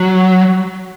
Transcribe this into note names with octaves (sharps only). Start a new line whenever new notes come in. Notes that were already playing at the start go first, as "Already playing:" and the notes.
Already playing: F#3